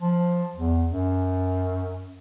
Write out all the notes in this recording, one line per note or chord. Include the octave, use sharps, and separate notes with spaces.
F3
E2
F#2